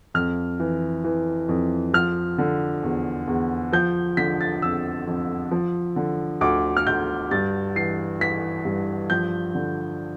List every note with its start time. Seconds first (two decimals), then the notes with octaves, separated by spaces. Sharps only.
0.14 F2 F6
0.60 E3
1.04 E3
1.49 F2
1.93 F3 F6
2.38 D3
2.83 E2
3.27 E2
3.72 F3 G6
4.17 D3 B6
4.41 A6
4.62 F2 E6
5.07 F2
5.51 F3
5.96 D3
6.41 D2 D6
6.77 F6
6.87 D2 G6
7.31 G2 A6
7.75 E3 C7
8.20 E3 B6
8.65 G2
9.10 F3 G6
9.55 D3